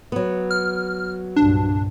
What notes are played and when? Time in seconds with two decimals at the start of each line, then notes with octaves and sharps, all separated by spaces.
0.12 F#3 B3
0.51 F6
1.36 C2 G2 A#2 D4